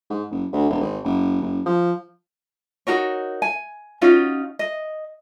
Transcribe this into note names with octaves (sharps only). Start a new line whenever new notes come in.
G#2
F#1
D2
E1
G#1
F#1
F#1
F3
D#4 F#4 A#4 C#5
G#5
C#4 D#4 F4 F#4
D#5